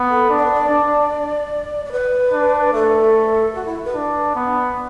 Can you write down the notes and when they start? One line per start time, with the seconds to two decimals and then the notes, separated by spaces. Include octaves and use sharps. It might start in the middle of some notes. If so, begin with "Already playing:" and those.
Already playing: B3
0.09 A4
0.30 D4
0.37 D5
0.44 B4
0.52 D5
0.70 D4
1.85 D5
1.92 B4
2.33 D4
2.73 A3 A4
3.54 F#4
3.65 E4
3.85 B4
3.95 D4
4.36 B3